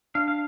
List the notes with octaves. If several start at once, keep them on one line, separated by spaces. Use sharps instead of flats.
D4 F5
F5